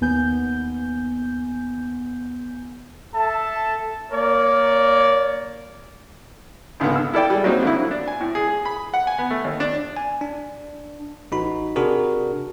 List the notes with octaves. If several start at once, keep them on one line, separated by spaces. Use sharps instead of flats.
D#2 B3 G#5 G6
A4 E5 A5
A#3 A#4 C#5 D5
G#1 C#2 D3 B3
E6
E4 A4 D5 G5
G3 G#3
F#3 A#3 C4 D#4 F#4
F2 D3 E4
D4
G#5
A2
G#4
G#4
B5
F#5
G#5
B3
A3
D#2
D4
G#5
D4
A1 D#4 F#4 B5
C3 D4 F#4 G#4 A#4